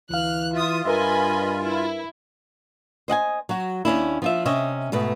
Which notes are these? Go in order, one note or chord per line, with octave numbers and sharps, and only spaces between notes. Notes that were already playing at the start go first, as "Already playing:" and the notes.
D2 E3 F5 F6 F#6
F4 E5 D#6
G2 A#4 B4 D#5 E5 G#5 B5
E4
C5 D#5 F#5 G#5
F#3 F#4
D#2 C#4 D4 E4
F3 F4 E5
C3 C#4 D#5 E5
G#2 B2 A3 B4